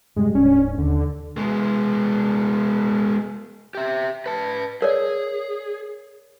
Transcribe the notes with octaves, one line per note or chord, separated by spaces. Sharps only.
G2 C3 G3 G#3
D1 G#2 C#4 D4
D#2 D3
G#3 B3
G4 E5
B4 A5
G#4 A#4 C#5 D5